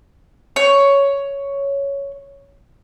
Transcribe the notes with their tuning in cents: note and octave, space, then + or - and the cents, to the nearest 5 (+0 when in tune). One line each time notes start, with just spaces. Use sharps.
C#5 +5